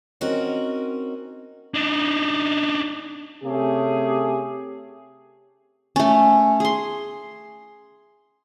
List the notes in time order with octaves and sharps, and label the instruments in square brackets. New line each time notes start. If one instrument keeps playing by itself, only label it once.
[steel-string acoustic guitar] C4 C#4 D#4 F#4 A#4 F#5
[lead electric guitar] D4 D#4
[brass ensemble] C3 A3 C#4 G4 G#4
[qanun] A3 C#4
G#4 C6